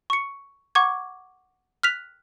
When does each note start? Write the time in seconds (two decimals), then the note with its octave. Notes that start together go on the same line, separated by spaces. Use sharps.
0.10 C#6 C#7
0.75 F#5 C#6 D6 G#6
1.83 F6 F#6 B6 F7